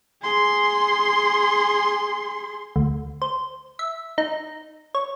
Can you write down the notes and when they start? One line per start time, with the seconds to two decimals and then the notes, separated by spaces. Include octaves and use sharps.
0.22 G#4 C6
2.76 D2
3.22 C5
3.79 E5
4.18 D#4
4.95 C#5